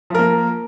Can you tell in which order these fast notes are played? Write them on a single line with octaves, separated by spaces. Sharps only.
F3 A#4 A#3